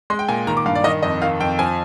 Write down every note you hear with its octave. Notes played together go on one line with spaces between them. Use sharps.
G#3 C6
G5
A#2 G#5
D#3 A#5
D6
G2 F5
D5
D#3 D#5
F2 D#5
D#3 F5
F2 G5
F3 G#5